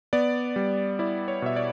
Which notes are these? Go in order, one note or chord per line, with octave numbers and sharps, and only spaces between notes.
B3 D5
G3
E4 D5
C#5
B2 E5
D5